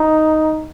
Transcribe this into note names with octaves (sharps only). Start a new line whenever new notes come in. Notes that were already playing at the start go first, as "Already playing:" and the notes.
Already playing: D#4